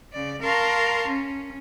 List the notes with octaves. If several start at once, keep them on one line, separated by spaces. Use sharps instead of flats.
C#3 D5
A#4 F5 A5 A#5 C6 C#6
C#4